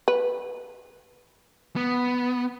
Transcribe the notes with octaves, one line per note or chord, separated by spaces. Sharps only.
B4
B3